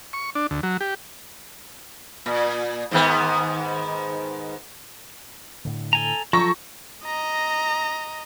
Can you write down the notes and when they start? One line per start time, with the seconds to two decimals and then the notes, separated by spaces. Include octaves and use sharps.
0.13 C#6
0.35 D4
0.51 D2
0.63 F#3
0.81 G4
2.26 A#2
2.91 G#2 D#3 B3
5.65 A2 D3
5.93 A4 G#5 A#5
6.33 F3 F#3 F4 A4 A#5 C#6 E6 A#6
7.06 D#5 A#5